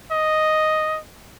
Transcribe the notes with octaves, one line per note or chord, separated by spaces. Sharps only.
D#5